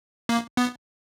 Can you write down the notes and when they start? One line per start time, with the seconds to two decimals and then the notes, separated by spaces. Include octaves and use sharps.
0.29 A#3
0.57 B3